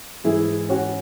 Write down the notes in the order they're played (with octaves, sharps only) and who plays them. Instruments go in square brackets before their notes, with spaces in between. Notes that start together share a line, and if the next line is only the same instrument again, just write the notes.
[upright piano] G#2 E3 E4 G#4
C#4 F#4